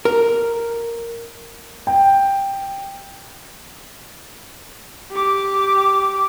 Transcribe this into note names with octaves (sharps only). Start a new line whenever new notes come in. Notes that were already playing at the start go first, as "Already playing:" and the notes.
A#4
G5
G4 D6